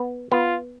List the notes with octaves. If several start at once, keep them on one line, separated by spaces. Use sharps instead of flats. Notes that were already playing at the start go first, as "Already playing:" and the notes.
Already playing: B3
B3 F4